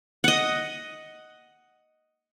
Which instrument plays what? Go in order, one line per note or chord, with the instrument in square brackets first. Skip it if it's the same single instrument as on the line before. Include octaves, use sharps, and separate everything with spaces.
[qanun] D#5 F#5